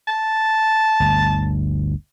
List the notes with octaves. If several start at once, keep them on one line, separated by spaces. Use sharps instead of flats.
A5
G1 D2